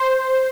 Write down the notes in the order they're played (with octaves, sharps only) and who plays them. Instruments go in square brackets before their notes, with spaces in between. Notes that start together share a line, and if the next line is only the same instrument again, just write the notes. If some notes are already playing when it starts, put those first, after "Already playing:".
Already playing: [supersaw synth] C5